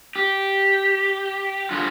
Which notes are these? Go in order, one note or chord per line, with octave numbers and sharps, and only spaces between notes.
G4
G2 D3 F4 F#4 G#4